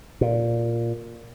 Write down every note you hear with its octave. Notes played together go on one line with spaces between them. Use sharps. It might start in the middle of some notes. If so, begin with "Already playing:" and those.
A#2